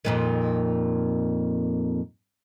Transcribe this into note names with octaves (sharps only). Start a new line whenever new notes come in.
F2 A#2 D#3